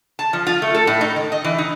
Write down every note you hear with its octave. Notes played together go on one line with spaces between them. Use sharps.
A5
F3
F4
A3
A4
A2
D#4
D#3
D#5
E3
D#4